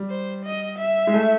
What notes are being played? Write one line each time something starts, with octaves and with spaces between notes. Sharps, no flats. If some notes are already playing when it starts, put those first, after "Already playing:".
Already playing: G3
C5
D#5
E5
G#3
A3